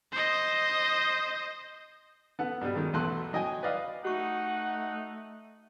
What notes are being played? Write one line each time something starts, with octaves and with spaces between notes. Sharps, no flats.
C5 D#5
B3 A4 F#5
G2 B2 G3
D#3 F#3 G#3
B1 E2 A3 A4 C6 F#6
F#3 D#5 G5 G#5
B4 D5 D#5 F5
A3 D#4 F#4 F#5 C#6